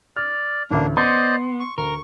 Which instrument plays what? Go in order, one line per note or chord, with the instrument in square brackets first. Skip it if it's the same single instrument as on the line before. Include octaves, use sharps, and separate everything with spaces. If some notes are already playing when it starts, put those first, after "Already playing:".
[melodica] D5 [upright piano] F6
[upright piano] A1 D2 [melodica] A#3 D4
[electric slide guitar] B3 [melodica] C5 D5 D#5 [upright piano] C6
[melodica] C#6
[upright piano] D2 [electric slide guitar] A#4 [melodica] C#6